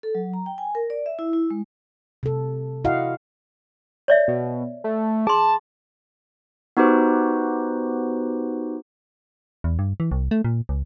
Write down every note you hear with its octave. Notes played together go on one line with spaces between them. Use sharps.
A4
F#3
A#5
G5
G#5
A#4
D5
E5
E4
E4
G#3
C3 A4
E4 F#4 D#5 F5 F#5
C#5 D5 E5
B2
A3
G#4 A5 C6
B3 D#4 F#4 G4 B4 C5
E2
G2
E3
C2
A3
A#2
C#2